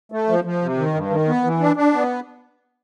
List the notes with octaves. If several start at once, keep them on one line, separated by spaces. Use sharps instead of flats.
A3
F3
F3
C3
D#3
G2
D#3
B3
E3
D4
D4
B3